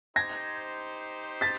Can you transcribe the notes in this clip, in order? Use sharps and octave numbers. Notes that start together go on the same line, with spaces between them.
D#4 G4 C5 G#6 A#6
A6 B6